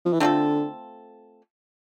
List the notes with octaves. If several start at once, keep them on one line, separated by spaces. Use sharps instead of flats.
F3
E3
D3 A3 C4 F4 A4